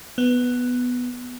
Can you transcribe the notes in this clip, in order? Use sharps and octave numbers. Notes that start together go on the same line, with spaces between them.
B3